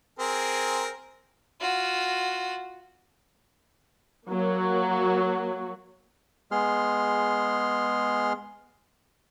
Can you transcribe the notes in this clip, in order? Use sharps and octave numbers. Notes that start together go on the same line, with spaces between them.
C4 G#4 A#4
F4 F#4
F#3 A#3
G#3 B3 G#4 C6 F6